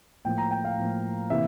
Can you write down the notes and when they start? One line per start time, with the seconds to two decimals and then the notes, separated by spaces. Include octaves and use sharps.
0.25 A2 F3 A#3 G5
0.38 A#5
0.51 G5
0.65 F5
0.77 A2 F3 A#3
1.30 C3 E3 A#3 E5